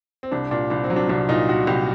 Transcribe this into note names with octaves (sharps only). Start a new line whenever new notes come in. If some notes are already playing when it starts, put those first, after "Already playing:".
C4
C2 D4
A#2 D4
C2 D4
C4
F#3
D4
C2 D4
A#2 D#4
A#2 F#4
C2 G4